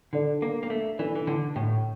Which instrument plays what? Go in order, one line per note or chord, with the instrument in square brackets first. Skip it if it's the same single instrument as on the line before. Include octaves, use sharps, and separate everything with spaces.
[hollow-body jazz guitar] D3 [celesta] D4 A4 D5
[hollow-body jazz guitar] A#3
A#3
A3
[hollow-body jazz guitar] E3 [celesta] D4 A4 D5
[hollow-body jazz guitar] E3
D3
A2